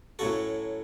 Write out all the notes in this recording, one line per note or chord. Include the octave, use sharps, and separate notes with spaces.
A2 F#3 C#4 F#4 A4